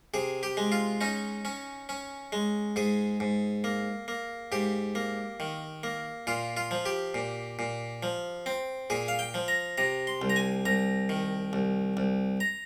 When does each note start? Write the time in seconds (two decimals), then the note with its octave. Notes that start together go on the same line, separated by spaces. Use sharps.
0.14 C3 G#4
0.43 G4
0.57 G#3
0.72 F4
1.01 C#4 D#4
1.45 C#4
1.89 C#4
2.32 G#3
2.76 G#2 G#4
3.20 G#2
3.64 A#3
4.08 A#3
4.52 G#2 G4
4.95 A#3
5.40 D#3
5.83 A#3
6.27 A#2 F4
6.57 F4
6.71 F3
6.86 G4
7.14 A#2
7.59 A#2
8.03 F3
8.46 C4
8.90 A#2 G#4
9.08 F5
9.19 G5
9.34 F3
9.48 A#5
9.78 C3 A#5
10.07 C6
10.22 C2
10.30 A#5
10.36 G#5
10.65 C2 A#5
11.09 D#3
11.53 C2
11.97 C2
12.40 A#5